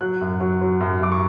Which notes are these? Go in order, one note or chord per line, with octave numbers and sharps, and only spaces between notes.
F#3 F#6
F#2
F#3
F#3
F#2
F#2 D6
C#6